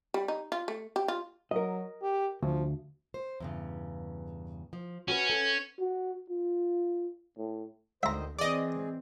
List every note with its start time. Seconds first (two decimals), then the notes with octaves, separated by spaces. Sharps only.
0.14 G3
0.28 D#4
0.52 F4
0.68 A3
0.96 G4
1.08 F4
1.51 F#3 A#4 D#5
2.02 G4
2.43 D2 F3
3.14 C5
3.40 E2 G2 C#3
4.73 F3
5.08 C#4 F#4 G4 B4
5.30 A4
5.79 F#4
6.30 F4
7.37 A2
8.03 D2 D#3 C5 D#5 E5 A#5
8.39 E3 C4 G#4 D5 D#5